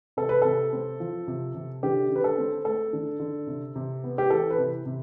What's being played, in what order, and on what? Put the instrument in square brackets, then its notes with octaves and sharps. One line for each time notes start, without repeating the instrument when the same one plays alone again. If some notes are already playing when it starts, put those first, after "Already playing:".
[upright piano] C3 A4
B4
C3 A4
C4
F3
C3
C3
D3 G4
D3
B4
A4
C4
A3 A4
D3
D3
C3
C3
B3
G4
E3 A4
B4
C3
C3